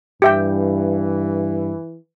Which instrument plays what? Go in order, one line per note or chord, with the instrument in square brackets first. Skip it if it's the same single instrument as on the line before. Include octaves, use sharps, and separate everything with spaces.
[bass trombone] G2 [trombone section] E3 [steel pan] G4 E5 G5